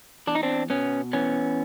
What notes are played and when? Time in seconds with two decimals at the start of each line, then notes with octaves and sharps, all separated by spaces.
0.27 E2 D4
0.35 D#4
0.43 C4 D4
0.70 B2 B3 C#4
1.13 E3 B3 C#4